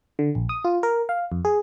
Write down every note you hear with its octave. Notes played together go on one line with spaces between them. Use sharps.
D3
A#1
D#6
F4
A#4
F5
F2
G#4